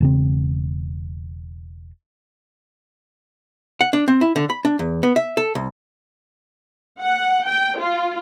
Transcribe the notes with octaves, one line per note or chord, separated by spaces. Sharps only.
E1 C#3 C4
F#5
D4
C4
E4
D3
B5
D4
E2
B3
E5
A4
C2
F#5
G5
F4